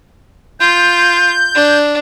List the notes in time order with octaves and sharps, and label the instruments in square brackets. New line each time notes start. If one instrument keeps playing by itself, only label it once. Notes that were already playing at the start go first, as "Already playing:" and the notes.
[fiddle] F4 [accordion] G6
[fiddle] D4